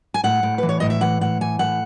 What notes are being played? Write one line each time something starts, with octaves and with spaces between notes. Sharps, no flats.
G#5
A2 F#5
A2
E3 B4
C#5
A2 D#5
E5
E3 F#5
A2 F#5
E3 G#5
A2 F#5